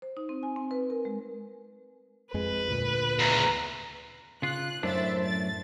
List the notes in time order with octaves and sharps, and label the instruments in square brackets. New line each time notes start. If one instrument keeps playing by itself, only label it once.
[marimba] C5
D#4
C4
G#5
C4
B4
A#4
G#3
[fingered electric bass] F2 G#3 [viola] B4
[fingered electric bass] D2 A#2
[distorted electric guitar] E2 C#3 [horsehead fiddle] A#5
[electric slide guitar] C#3 F4 [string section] F#6
[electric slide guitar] F#2 A2 D4 [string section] C5 E5 A6
[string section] A6